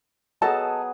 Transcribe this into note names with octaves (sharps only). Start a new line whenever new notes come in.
F#3 B3 G#4 A4 D#5 A5